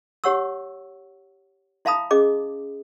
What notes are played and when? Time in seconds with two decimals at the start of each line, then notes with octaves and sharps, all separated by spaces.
0.24 G4 C#5 F#5 C#6 E6
1.85 E4 E5 F5 A5 B5 D#6
2.11 C#4 G#4 D#5 D6